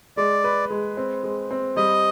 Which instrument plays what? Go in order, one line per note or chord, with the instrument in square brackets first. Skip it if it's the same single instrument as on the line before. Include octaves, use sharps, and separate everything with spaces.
[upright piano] G#3 [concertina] D5
[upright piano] B4
G#3
C4
G#3
C4
[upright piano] G3 [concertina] D#5